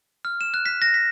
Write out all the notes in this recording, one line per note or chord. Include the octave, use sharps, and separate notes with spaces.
F6
E7
F#6
B6
A#6
B6